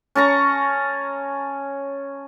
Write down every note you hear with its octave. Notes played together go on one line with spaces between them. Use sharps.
C#4 A5 A#5 C#6